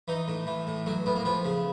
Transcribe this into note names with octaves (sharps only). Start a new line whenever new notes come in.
E3 D#4
A2
E3
A2
F#3 A3
A2 B3
A#3
F3 B3
C#3